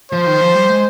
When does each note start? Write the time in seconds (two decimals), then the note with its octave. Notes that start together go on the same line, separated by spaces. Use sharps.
0.12 F3 C5
0.26 D#3
0.41 F3
0.55 G3
0.70 G#3